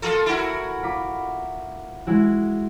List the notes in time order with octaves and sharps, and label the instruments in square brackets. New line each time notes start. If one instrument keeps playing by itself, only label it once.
[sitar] A#3 F4 A4
E4 F#4 A#4
[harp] F4 B5 D6
G#3 E4 F#4